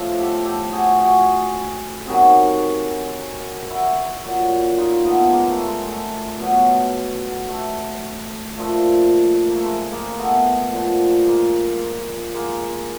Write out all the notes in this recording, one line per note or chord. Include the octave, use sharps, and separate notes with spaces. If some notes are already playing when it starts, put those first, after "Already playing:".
Already playing: A2 F3 F4
G4 A4
G4 A4
F#4 G#4
F#4 G#4
C3 D#3 F#3 F#4 G#4
E4 F#4
A#2 F#3
D#4 F4
A3 B3
G#3 A#3
A3
G#3
A3
B2 F#3
A3
A#2 F3 A3
A#3
A3
G#3
G#3 A#3
A3 B3
A#2 F3
G#3 A#3
G#3 A#3